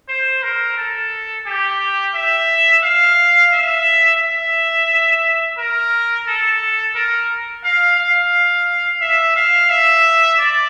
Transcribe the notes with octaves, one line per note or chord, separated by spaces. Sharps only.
C5
A#4
A4
G4
E5
F5
E5
E5
A#4
A4
A#4
F5
F5
E5
F5
E5
D5